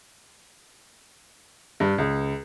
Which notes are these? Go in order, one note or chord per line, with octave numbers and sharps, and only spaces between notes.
G2
C#2